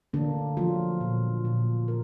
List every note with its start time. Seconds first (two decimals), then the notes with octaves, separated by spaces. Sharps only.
0.13 D3 A#3 D4
0.57 F3 F#3 F4
1.01 A#2
1.45 A#2
1.88 A#4